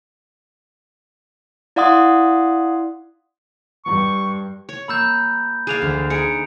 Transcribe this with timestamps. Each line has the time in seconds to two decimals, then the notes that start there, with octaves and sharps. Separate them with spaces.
1.76 E4 D5 F5 F#5 C6 D#6
3.85 G2 C#6
4.69 C#5
4.88 A#3 B5 E6 F6 G6
5.67 G#4 D5 F5 F#6 E7 F7
5.82 D2
6.10 D#4 G#4 C#7 D7